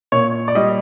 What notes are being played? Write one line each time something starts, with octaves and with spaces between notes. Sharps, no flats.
A#2 C#5
D5
G3 D#5